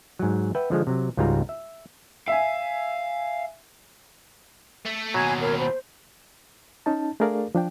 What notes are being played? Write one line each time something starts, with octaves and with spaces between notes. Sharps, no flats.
G#2 F#3
B4 E5 F#5 G5
D3 F3 G#3
C3 F#3
C#2 G#2 G3 F4 F#4 A#5
E5
E5 F5 G#5
A3
D#2 B2 F#3 G#5 G#6
A#4 C#5
C5
C#4 D#4 A5
A3 D4 G#4 A#4 D5 F5
F3 D4 G5